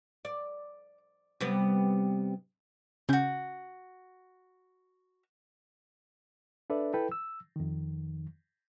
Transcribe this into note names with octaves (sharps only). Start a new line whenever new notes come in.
D5
C3 G3 B3
C#3 C#4 E4 F#4 G6
D4 A4 B4 D5 E5
E4 A4 B4 G5
E6
F2 D#3